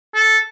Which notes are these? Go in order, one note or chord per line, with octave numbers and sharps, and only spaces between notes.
A4